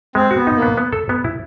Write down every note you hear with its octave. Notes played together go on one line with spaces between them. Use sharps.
G#3 C4
F#4
B3
D#4
A#3
B3
B3
A4
B3
E4